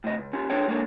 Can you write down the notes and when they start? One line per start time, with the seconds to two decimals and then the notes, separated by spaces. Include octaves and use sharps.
0.04 A2 C#3 D#5
0.18 C#2
0.33 C#4 F4 G4
0.50 D4 F4 G#4 A4 C#5 G5
0.68 G#3 A#3 D4 E4 A4 C#5